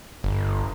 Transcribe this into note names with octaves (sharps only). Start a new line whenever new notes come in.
G1